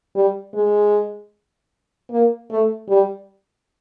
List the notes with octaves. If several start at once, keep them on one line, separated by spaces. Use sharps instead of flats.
G3
G#3
A#3
A3
G3